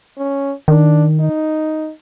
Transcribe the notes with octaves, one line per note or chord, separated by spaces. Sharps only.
C#4
D#3 D4
D#4